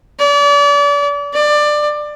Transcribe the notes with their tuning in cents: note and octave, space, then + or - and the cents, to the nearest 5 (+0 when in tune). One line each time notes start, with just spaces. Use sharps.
D5 -35
D5 +20